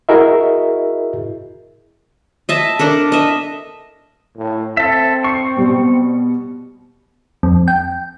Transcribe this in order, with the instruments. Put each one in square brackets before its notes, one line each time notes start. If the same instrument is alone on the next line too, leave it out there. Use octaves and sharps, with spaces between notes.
[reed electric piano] E4 F#4 G#4 A#4 D#5 E5
[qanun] D#5 E5 A5
D4 A4 A#4
D#5 E5
[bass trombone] A2
[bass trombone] C4 [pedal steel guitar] A4 E5
[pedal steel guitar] C#6 [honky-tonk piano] C7
[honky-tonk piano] B2 G3
[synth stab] F2
G5